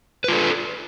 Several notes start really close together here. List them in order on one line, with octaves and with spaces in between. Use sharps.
B4 F4 A4